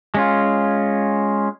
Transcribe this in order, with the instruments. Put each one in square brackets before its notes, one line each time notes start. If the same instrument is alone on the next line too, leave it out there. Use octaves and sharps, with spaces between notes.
[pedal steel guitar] G#3 C#4 F4